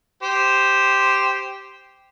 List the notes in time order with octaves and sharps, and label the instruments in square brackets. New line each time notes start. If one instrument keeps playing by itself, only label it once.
[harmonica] G4 C5